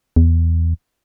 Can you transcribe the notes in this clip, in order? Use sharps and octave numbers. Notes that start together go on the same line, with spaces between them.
E2